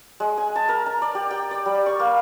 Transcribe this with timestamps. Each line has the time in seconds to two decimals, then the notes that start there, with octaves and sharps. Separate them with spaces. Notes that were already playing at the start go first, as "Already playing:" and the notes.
0.20 G#3
0.38 G#5
0.56 A5
0.69 A#4
0.86 A#5
1.02 D5
1.15 G4
1.31 G5
1.51 D5
1.66 G3
1.86 C#6
2.00 A#3